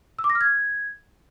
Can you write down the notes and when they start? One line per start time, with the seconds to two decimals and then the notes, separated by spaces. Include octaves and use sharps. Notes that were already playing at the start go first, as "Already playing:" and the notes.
0.19 E6
0.24 D6
0.30 A#6
0.35 F6
0.41 G#6